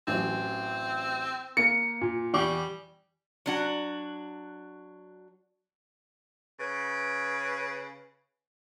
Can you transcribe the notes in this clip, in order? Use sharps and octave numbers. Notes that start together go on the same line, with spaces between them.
A1 F#2 C4
A#3 C#7
A#2
E2 G3 C#6 D6
F#3 D4 F#4
C#3 B4